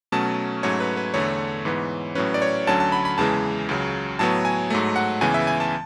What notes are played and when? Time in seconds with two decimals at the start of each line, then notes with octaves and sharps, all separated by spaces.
0.12 B2 F#3 A3 C#4 A5
0.63 G#2 F#3 A3 C#4 C#5
0.80 B4
0.97 B4
1.14 E2 D3 A3 C#5
1.65 G#2 E3 B3
2.15 A2 F#3 C#4 B4
2.34 D5
2.42 C#5
2.67 D2 D3 F#3 C#4 A5
2.80 A5
2.92 B5
3.05 B5
3.18 E2 C#3 E3 G#3 A5
3.69 C#2 C#3 F#3
4.19 A2 F#3 B3 A5
4.45 G#5
4.70 G#2 F#3 A3
4.96 F#5
5.21 C#2 C#3 E3 B3 G#5
5.34 E5
5.47 G#5
5.60 A5